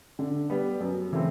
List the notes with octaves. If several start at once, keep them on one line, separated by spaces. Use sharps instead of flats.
D3
G3 B3
F#2
C#3 E3 A3 C4